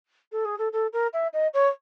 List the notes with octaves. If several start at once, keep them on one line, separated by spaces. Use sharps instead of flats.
A4
G#4
A4
A4
A#4
E5
D#5
C#5